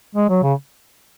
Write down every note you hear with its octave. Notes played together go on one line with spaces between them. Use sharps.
G#3
F#3
C#3